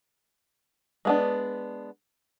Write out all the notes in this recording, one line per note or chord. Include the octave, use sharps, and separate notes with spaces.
G#3 B3 D4